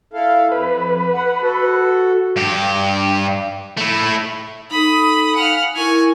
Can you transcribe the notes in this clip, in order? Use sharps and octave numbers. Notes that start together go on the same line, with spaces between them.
E4 A4 F5
F2 B4
F#5
F#4 A4
G2 G4
A3 E4
D#4 A4 B5 D#6
F5 F#5 G#5 F6
E4 A#4 G#5 C#6